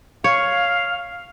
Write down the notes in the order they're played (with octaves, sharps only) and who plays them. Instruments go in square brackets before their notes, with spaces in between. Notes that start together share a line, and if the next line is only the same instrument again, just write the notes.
[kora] C#5 [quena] F5